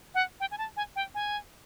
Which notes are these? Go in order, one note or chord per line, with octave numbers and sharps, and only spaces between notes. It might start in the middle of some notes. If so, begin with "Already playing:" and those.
F#5
G5
G#5
A5
G#5
G5
G#5